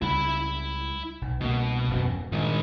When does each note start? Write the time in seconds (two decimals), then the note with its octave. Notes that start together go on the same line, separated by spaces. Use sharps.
0.02 C#2 G3 E4 B5
1.21 B1
1.41 C2 B2 A#3
1.90 D#1 F#2 E3
2.32 G2 A#2 D#3 G#3